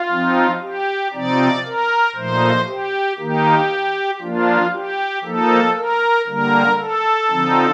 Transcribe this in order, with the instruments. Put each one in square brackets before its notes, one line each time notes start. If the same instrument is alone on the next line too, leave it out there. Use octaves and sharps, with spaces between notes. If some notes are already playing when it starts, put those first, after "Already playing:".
Already playing: [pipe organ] F4
F3 C4 D#4
G4
C3 F3 C4 D#4 D5
A#4
A#2 F3 A3 D#4 C5
G4
D#3 A#3 D#4 G4
F3 A#3 D4 F4
G4
F3 A#3 D#4 A4
A#4
D3 G3 A#3 A#4
A4
D3 F3 C4 D#4